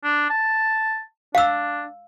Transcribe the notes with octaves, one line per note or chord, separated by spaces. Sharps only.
D4
A5
D4 F5 E6